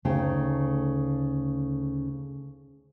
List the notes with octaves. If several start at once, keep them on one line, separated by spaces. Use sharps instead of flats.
D2 C#3 A3 D#4 G5